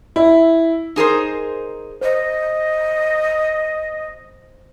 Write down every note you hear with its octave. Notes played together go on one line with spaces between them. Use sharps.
E4
D#4 G#4 A#4 C5
C5 D#5